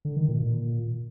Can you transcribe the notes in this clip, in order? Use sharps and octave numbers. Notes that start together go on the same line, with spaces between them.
D3
D#3
A#2
A#2